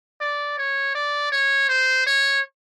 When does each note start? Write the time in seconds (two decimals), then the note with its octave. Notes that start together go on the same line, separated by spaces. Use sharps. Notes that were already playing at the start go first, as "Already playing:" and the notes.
0.21 D5
0.58 C#5
0.95 D5
1.32 C#5
1.69 C5
2.07 C#5